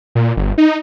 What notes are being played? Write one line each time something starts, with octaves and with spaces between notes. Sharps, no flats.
A#2
G1
D#4